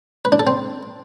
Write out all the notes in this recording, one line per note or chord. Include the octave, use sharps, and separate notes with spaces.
B4
D4
A4
C4